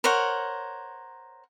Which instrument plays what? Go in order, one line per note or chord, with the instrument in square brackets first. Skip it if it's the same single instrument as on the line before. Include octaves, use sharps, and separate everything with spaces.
[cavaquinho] A#4 C5 C#5 F#5